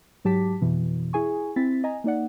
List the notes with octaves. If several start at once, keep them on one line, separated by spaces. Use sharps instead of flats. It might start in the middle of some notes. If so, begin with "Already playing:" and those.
G#2 F#3 G4 A5 D6 B6
F2 B2 E3
E4 G#4 G#5 C#6
C4 E4 A6 B6
D#5 G#5 A#5
A#3 D#4 D5 F#5